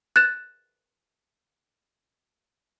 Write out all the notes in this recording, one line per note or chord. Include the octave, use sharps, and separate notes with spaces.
F#6 A6 E7